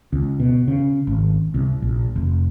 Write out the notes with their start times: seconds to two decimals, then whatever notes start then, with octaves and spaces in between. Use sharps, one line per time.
0.13 C#2
0.40 B2
0.68 C#3
1.07 G#1
1.54 C2
1.82 A#1
2.16 F1